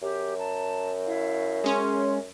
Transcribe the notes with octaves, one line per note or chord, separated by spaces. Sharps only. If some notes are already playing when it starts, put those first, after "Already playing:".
F#2 G4
A5 A#5
E4 F5
G#3 C#4 C6